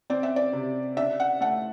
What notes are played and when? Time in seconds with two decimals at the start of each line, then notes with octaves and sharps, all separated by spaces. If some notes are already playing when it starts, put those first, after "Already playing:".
0.10 C4 D5
0.23 E5
0.36 D5
0.53 C3
0.97 D4 E5
1.20 F#5
1.41 A3 F#5